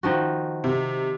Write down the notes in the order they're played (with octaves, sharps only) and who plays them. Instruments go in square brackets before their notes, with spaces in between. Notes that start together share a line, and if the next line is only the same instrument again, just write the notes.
[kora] D#3 F3 F#4
[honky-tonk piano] C3